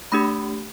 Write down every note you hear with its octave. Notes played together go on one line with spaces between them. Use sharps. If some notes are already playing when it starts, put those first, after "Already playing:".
A3 D4 G4 B5